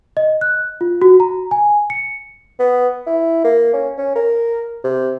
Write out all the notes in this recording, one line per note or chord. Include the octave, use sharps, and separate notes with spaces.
D#5
F#6
F4
F#4
A#5
G#5
C#7
B3
E4
A#3
C#4
C#4
A#4
C3